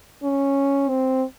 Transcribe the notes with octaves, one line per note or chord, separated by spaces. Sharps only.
C#4
C4